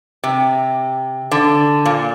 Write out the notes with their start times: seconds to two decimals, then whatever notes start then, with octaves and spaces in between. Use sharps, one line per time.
0.24 C3
1.31 D3
1.85 A#2